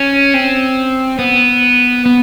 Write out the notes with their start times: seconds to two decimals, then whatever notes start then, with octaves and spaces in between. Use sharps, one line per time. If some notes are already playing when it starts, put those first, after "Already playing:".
Already playing: C#4
0.34 C4
1.19 B3
2.06 B3